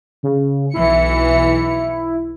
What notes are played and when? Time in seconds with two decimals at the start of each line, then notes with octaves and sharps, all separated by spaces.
0.23 C#3
0.74 B1 E3 E4 C#7